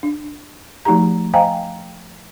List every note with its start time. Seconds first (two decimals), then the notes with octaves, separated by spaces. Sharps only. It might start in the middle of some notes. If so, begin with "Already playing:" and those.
0.03 D4
0.85 F3 A3 D#4 F#4 G4 A#5
1.34 C5 D#5 F5 G5 G#5 A#5